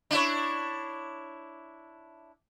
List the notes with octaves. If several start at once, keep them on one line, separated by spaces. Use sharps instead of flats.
D4 E4 C#5